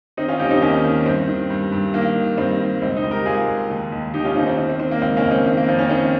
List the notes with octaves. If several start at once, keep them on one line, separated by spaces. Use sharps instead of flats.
D#3 C4 D#4
C#4 F4
D#2 D#4 G4
C4 D#4
D#2 A#3 C#4
D#3
G2 C4
D#3
G2
G2
D#3 A#3
D#3
G2 C4
G2
C#2 C4
C4 D#4
C#2
G4 A#4
C#2 F4 G#4
C#2
D#2
D#2
D#2 D#4 G4
C#4 F4
D#2 C4 D#4
C4
D#3 C4
C4
D#3 C4
A#3
C#2 C4
A#3 C#4
C#2
C4
D#3 C4
A#3
F2 C4
A#3 C#4
D#3 C4